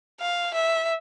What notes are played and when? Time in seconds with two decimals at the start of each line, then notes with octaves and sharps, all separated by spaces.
0.20 F5
0.54 E5